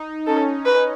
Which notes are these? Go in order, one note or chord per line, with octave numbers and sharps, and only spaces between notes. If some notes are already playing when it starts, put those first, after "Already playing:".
Already playing: D#4
C#4 A4
B4